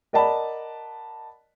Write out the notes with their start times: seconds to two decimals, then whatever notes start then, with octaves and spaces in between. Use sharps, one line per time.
0.13 A#4 D5 D#5 F#5 A5 B5